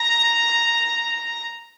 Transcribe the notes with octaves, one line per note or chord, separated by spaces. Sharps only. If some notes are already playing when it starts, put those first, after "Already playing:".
Already playing: A#5